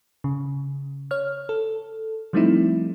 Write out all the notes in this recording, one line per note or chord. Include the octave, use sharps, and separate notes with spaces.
C#3
C#5 F6
A4
F3 G3 A3 C4 D#4 E4